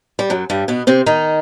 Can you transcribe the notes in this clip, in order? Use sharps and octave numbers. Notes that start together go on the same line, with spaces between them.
G3
F#2 F#3
G2 G3
B2 B3
C3 C4
D#3 D#4